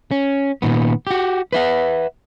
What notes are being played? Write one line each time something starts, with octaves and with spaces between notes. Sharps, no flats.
C#4
A#2 D#3 B3
F#4 G4
B4 E5 F#5